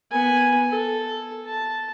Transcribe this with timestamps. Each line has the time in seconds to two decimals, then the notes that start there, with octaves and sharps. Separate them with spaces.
0.12 B3 G#5
0.70 A4
1.46 A5